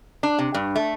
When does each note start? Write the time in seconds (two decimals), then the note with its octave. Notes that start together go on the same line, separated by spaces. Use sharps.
0.23 D4
0.39 C3
0.54 G2
0.76 A3